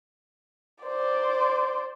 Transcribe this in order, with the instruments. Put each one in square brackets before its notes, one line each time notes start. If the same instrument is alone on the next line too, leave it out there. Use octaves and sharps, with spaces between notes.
[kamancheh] C5 D5